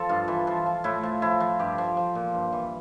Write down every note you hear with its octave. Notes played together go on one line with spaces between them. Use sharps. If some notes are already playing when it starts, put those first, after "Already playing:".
Already playing: F3 A4
G2 F4
E3
F3
F3
A2 E4
F3
F3 E4
F3
G2 G4
F3
F3
A#2
G2
E3